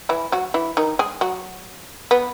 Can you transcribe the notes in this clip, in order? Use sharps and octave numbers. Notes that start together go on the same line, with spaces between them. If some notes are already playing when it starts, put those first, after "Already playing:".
E3 E4
F#3 F#4
E3 E4
D#3 D#4
G#3 G#4
F#3 F#4
B3